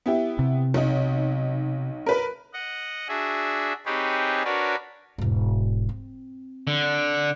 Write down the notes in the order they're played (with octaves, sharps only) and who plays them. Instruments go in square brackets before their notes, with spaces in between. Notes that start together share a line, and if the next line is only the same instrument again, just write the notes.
[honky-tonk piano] B3 E4 G4
[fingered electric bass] C3
[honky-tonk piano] B1 D#4
A#4 B4 B5
[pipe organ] D#5 F#5
D4 F#4 G#4 E5
C4 D#4 G4 G#4 B4 C#5
D4 F#4 A#4 B4 C#5 D5
[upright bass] E1 G#2
C4
[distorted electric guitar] D3